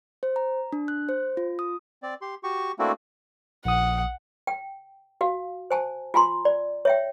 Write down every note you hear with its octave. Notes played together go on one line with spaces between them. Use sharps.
C5
A#5
D4
F#6
C5
F4
D#6
C4 D5
G4 C6
F#4 G4 C#6
A3 A#3 C4 D4 E4 F#4
A#1 F#5 D#6
G5
F#4 F5
C5 G#5 A5
F4 G#5 A#5 C6
D5
C#5 E5 G5